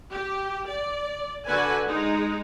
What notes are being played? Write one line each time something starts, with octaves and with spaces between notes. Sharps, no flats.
G4
D5
D3 F#4 B4 G#5
G#3 D#4